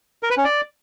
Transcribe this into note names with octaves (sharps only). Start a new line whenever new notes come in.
A#4
B4
C#4
D5